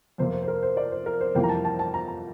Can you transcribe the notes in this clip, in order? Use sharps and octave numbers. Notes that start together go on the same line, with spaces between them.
F2 C3 F3 A#3 C5
C5
C5
A#4
C5
D5
C5
A#4
C5
F2 C3 E3 G3 A#3 G5
A#5
A5
A5
A5
A#5
A#5